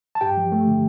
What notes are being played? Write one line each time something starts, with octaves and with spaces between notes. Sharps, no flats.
A5
G2 G4 G5
F3
A3
D3